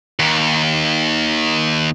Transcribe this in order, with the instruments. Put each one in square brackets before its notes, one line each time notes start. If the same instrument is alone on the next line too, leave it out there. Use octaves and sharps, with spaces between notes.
[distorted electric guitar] D#2 D#3